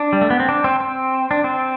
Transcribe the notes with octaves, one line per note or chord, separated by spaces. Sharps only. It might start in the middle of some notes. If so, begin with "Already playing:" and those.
Already playing: D4
G3
A3
B3
C4
D4
C4
C4
D4
C4